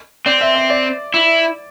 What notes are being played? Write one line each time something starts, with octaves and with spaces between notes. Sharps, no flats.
C4 D5
E5
E5
D5
E4